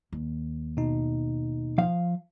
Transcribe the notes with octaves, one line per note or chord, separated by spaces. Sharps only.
D#2
B2 D#4
F3 F5